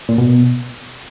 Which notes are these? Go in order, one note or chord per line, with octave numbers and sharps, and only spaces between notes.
A#2
B2